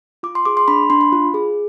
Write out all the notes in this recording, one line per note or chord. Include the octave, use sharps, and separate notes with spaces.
F4 D6
C6
G#4 D6
C6
D4 B5
D4 C6
B5
F4
G#4